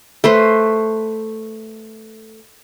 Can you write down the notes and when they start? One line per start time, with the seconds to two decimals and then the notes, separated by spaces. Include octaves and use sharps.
0.24 A3 B4 C5